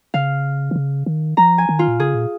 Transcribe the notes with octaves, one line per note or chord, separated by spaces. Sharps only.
C#3 F5
D#3
C#3
D#3
F3 A#5
G#5
D#3
F4
A#2
C#3 G#4
A#2